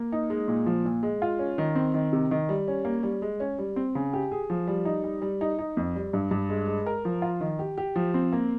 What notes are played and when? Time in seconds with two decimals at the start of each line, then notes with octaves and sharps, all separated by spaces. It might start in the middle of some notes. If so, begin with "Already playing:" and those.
Already playing: A#3
0.12 D#4
0.30 G#3
0.48 A#2
0.66 F3
0.85 A#2
1.03 G#3
1.22 F4
1.39 C#4
1.58 D#3
1.75 C4
1.94 D#3
2.13 C3
2.31 D#3
2.49 G3
2.68 C#4
2.85 A#3
3.03 G3
3.22 G#3
3.40 C#4
3.59 G3
3.76 C4
3.95 C#3
4.13 G4
4.32 G#4
4.50 F3
4.67 G3
4.85 D#4
5.04 G3
5.22 G3
5.41 D#4
5.59 D#4
5.77 F2
5.95 G3
6.13 G2
6.31 G2
6.49 G#3
6.68 G#3
6.86 A#4
7.05 F3
7.22 F4
7.41 D#3
7.59 G4
7.78 G4
7.96 F3
8.14 C4
8.32 A#3